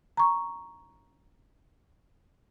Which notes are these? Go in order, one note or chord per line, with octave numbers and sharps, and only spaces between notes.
A#5 C#6